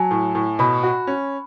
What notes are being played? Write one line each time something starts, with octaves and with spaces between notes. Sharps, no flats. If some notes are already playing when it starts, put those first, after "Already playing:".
Already playing: F#3 G#5 A5
A2
A2
B2 B5
F#4
C#4